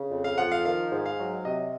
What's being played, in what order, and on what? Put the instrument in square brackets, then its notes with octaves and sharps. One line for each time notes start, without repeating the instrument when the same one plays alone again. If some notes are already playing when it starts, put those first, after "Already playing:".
Already playing: [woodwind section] C#3
F2
[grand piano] F5
[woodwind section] F3 [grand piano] F#5
[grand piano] F5
[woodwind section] D#3 [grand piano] F5
[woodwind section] G#2
[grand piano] F5
[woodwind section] F#3
[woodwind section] C3 [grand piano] D#5